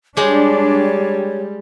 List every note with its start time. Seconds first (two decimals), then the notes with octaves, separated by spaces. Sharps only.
0.17 G3 G#3 D4 G4 C#5